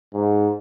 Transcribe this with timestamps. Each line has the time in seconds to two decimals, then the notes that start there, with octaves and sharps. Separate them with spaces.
0.14 G#2